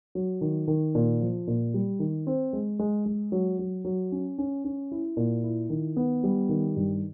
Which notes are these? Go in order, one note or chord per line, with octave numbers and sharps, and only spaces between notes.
F#3
D#3
D#3
A#2
F3
A#2
G3
D#3
C4
G#3
G#3
G#3
F#3
F#3
F#3
C#4
C#4
C#4
E4
A#2
E4
D#3
B3
G3
D#3
G2